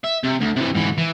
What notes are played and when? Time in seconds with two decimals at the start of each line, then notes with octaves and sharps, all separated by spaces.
0.04 E5
0.24 C3
0.41 D2
0.57 C3 E3
0.75 G#2 E3
0.98 E3